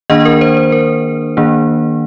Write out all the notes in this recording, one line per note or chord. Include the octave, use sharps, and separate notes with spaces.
D#3 A#3 D4 D#5
A#4
C5
C5
A#4
D#3 A#3 D4